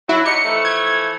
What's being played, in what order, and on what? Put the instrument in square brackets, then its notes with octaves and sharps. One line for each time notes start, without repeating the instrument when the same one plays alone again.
[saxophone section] F#3 [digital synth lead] E4
[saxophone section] D#4 G4 [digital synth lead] C#7
[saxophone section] E3 F3 A3
[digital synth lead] G#6